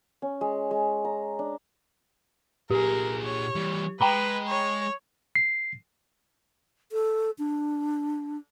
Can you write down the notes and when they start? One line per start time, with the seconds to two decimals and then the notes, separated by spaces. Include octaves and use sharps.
0.22 C#4
0.41 G#3
0.71 G#3
1.05 A#5
1.39 D4
2.71 A#2 G4 G#4 A#4
3.23 C#5
3.55 E3 G3
4.01 G#3 B4 G5 A#5 B5
4.47 C#5
5.35 C7
6.92 A4
7.39 D4